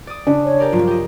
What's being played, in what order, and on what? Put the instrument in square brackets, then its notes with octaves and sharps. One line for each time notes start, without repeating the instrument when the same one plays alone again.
[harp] D5 D#6
[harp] C#3 [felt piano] D4
[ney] C#5
[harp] G4 A#4 D5
[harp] G2 F3 F#3 [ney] F4
[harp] G4 D#5